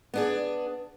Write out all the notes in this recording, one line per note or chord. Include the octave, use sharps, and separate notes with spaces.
B3 D4 G#4